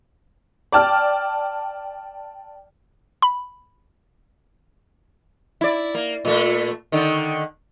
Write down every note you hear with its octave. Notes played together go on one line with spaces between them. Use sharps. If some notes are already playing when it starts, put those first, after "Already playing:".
D5 G5 A5 F6
B5
E4 D5
A#3
A#2 A3
D3 D#3